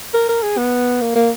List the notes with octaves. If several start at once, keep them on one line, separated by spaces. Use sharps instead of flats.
A#4
A#4
G#4
B3
A#3
A#3